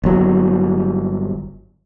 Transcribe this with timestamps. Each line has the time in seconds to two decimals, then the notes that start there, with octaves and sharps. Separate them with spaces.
0.03 G1 F#3